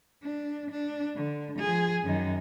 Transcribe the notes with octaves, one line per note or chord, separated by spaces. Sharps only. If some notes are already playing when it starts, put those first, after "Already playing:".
D4
D4
D3
F3 G#4
F#2 D#3